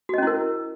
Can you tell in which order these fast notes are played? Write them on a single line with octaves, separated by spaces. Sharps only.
F#4 D#5 C#4 E4 A#4